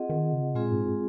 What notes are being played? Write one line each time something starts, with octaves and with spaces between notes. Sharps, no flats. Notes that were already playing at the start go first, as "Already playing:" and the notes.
Already playing: C4 F4 G#4 D#5 F#5
D#3
C#3
A#2 G#3 C4 F4 G#4
G#2